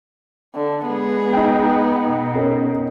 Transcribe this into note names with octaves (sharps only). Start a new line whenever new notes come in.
D3
G#3 B3 G#4
D#4 G5
B2
C#4 A#4